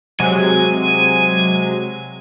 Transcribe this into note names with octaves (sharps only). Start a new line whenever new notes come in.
C3 F#3 G#3 G#5